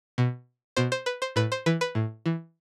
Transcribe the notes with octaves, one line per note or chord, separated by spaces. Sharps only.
B2
B2 C5
C5
B4
C5
A2 B4
C5
E3 B4
B4
A2
E3